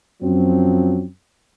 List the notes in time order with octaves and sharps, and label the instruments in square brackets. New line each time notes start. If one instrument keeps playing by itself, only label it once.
[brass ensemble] F#2 F3 F#3 C4 F#4